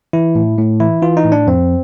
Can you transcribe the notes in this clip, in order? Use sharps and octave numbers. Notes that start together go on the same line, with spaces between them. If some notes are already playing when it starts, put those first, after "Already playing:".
E3 E4
A2
A2
E3 E4
E3 F4
D#4
A2
D4
F2 C4